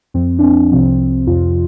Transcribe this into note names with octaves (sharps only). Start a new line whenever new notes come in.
F2 F3 C4
D4
C4
C2 C3 F3 C4
F2 C3 F3 F4